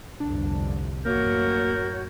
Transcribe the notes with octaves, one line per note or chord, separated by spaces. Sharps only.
G1 C2 F2 D4
A1 F#2 A#3 F#4 A#4 C#5 G6